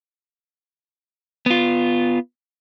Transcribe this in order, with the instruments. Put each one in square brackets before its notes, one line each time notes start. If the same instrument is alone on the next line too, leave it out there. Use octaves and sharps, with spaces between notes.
[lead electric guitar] B3 F4